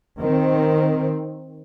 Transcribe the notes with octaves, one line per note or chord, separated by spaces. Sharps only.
D#3 C4